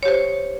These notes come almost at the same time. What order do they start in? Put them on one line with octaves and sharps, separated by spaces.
C#5 G4 C5